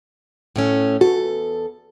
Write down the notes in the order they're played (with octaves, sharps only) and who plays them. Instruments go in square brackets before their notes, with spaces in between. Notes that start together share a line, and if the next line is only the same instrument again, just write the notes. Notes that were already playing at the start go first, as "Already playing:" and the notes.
[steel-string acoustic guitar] A2 A3 C#4
[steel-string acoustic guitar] E2 A4 [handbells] F#4